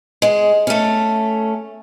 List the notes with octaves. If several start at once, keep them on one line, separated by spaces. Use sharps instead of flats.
G#3
A3 C#4